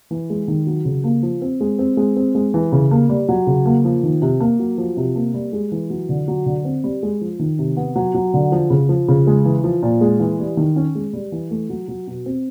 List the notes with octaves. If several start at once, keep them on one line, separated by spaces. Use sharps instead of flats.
E3
G#3
D#3
F#3
C#3
A#3
F3
C4
G#3
C4
G#3
C4
G#3
E3
C#3
A#3
G3
F#3
C#3
A#3
F3
D#3
C3
A#3
F#3
F3
C3
A#3
G3
G#3
E3
F#3
D3
F#3
D3
C4
G3
G#3
F3
D#3
C3
B3
F#3
F#3
D3
F3
C#3
F3
C#3
G#3
E3
F3
A#2
G#3
E3
G3
D#3
C#4
G#3
G3
E3
A3
F#3
F#3
B2
C4